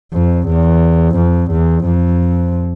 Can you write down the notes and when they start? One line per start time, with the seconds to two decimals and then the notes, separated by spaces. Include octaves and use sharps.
0.13 F2
0.48 E2
1.16 F2
1.51 E2
1.85 F2